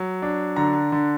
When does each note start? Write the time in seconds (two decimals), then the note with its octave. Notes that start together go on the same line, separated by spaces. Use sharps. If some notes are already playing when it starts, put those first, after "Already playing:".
Already playing: F#3
0.22 D4
0.56 D3 A#5
0.92 D3